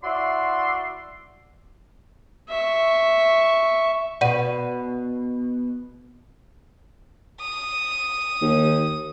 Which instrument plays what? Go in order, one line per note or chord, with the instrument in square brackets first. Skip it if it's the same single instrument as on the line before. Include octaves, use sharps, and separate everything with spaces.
[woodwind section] E4 F#4 D5 E5 C6
[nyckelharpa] E5 C#6
[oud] B2 [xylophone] D5 F#5 D#7
[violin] D#6
[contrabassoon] D#2